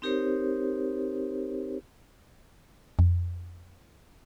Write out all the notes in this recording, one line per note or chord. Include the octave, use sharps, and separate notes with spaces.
C4 D#4 G4 A#4 C5 C#5
F2